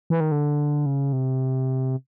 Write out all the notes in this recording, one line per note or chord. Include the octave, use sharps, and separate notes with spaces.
E3
D#3
D3
C#3
C3